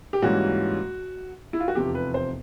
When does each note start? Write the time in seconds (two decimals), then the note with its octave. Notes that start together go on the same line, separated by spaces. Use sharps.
0.13 G4
0.22 G#2 E3 G3 A#3 C#4 F#4
1.53 E4
1.60 F4
1.68 F#4
1.75 F1 E2 C3 F3 G4
1.95 B4
2.14 C5